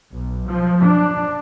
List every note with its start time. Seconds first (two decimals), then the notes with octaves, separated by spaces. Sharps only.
0.10 B1
0.47 F3
0.81 D4